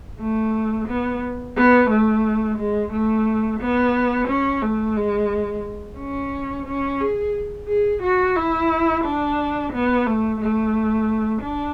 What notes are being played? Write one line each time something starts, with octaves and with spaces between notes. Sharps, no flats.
A3
B3
B3
A3
G#3
A3
B3
C#4
A3
G#3
C#4
C#4
G#4
G#4
F#4
E4
D4
B3
A3
A3
D4